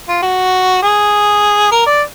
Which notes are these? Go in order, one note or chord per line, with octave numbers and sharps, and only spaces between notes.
F4
F#4
G#4
A#4
D5